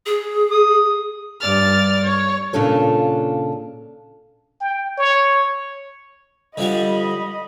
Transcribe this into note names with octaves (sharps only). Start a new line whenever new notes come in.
G#4
D#6
G2 D5 F6 A6
C#5
A#2 C#3 D4 F4 A4 C#5
G5
C#5
D3 F3 G3 D#5 B5